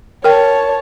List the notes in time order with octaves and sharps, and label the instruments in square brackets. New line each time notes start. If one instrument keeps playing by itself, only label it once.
[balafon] A#4 G5 [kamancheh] C#5 A5